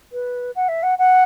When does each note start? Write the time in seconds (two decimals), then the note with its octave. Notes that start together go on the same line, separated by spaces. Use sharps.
0.12 B4
0.55 F#5
0.68 E5
0.83 F#5
0.98 F#5